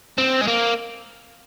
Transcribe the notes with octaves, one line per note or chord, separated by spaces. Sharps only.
C4
G#3
A#3